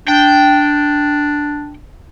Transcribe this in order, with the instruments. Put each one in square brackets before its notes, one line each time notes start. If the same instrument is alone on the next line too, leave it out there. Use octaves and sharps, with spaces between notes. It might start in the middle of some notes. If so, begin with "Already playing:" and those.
[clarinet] D4 [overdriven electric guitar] G5